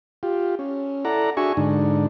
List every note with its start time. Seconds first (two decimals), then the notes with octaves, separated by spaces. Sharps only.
0.23 F4 G4
0.59 C#4
1.05 E4 A4 D5 F#5 A#5
1.37 D4 F#4 G#4 E5 G#5 C#6
1.57 G#2 D3 D4 D#4